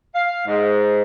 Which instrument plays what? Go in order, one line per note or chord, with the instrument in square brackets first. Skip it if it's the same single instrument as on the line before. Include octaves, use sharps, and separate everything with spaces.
[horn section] F5
G#2